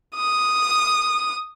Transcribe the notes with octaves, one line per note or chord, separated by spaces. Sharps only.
D#6